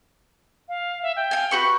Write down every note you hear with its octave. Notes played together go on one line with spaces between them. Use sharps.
F5
E5
G5
F5 G#5
F#4 B4 C#6